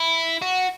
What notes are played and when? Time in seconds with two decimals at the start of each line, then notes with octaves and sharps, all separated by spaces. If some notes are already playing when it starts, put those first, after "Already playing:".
Already playing: E4
0.42 F#4